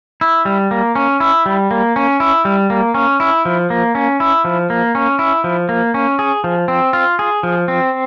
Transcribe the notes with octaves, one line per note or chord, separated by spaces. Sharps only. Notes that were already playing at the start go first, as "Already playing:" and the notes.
E4
G3
A#3
C#4
E4
G3
A#3
C#4
E4
G3
A#3
C#4
E4
F3
A#3
C#4
E4
F3
A#3
C#4
E4
F3
A#3
C#4
G#4
F3
C4
F4
G#4
F3
C4